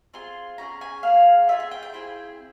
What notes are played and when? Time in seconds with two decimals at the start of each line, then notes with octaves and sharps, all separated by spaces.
0.14 C4 F4 G#4 C6
0.58 C#4 F4 G#4 A#5
0.81 G#5
1.03 A#3 E4 G#4 F5
1.48 C4 F4 G#4 E5
1.60 E5
1.71 G5
1.83 G5
1.93 C4 E4 G#4